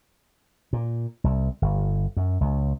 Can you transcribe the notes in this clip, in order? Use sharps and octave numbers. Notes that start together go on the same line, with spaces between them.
A#2
C2
G1
F#2
C#2